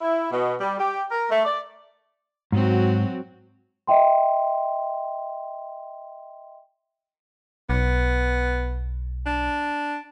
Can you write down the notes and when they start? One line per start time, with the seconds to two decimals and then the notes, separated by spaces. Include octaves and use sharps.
0.01 E4
0.31 B2
0.60 G3
0.79 G4
1.11 A#4
1.30 A3
1.45 D5
2.52 G#2 F#3 C4 F#4
3.87 D#5 E5 G5 C6
7.70 B1 B3
9.26 D4